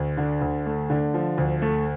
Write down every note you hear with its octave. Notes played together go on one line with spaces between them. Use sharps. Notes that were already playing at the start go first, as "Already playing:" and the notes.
Already playing: D2
D3
D2
A3
D3
F3
D2
A3